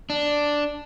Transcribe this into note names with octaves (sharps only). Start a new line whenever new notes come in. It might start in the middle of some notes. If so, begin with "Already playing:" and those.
D4